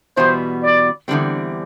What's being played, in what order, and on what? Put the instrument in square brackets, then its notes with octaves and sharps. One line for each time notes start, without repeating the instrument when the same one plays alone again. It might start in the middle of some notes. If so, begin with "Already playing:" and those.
[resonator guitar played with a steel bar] E2 B2 G3 B3 [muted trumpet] C5
[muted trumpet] D5
[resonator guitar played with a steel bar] E2 D3 G3 C4